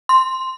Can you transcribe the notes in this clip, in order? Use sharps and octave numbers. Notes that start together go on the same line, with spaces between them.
C6